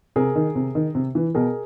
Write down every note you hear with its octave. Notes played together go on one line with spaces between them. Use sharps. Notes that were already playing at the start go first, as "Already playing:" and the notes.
C3 G#4 A#4
D#3
C3
D#3
C3
E3
B2 G#4 A#4